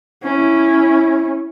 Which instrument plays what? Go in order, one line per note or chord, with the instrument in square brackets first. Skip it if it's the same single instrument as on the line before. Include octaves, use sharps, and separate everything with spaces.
[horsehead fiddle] C#4 E4